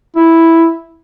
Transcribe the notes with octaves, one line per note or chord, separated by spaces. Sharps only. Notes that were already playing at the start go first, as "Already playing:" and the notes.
E4